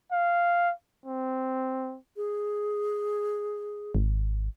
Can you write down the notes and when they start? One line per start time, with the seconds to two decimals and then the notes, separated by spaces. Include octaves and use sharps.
0.11 F5
1.06 C4
2.17 G#4
3.95 G#1